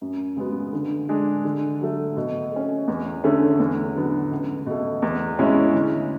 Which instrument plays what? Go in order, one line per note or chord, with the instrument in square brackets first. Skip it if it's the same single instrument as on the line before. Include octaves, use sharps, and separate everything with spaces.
[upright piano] F#2
C#3 G#3 B3 F#4
D3
G#3 D4 G#4
D3
F#3 A3
B2
A3 C#4
E2
D3 A3 C#4 G#4
E2
D3 F#3 B3
C#2
B2 A3
E2
B2 G#3 C#4 E4
D2